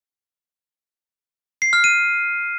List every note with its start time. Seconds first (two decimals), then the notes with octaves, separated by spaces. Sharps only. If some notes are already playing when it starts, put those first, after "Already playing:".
1.62 C7
1.73 F6
1.84 D#7